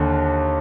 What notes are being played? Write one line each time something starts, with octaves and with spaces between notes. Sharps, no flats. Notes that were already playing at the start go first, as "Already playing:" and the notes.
Already playing: D#2 D3